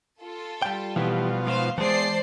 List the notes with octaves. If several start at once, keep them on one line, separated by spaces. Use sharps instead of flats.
F4 A4
G3 G5
B2 E3 F3 E4 G4
G#2 F4 C5 F5
E2 E3 G#3 G#4 C5 D5 A5 C7